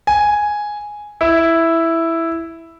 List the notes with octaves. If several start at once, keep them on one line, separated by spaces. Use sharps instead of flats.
G#5
E4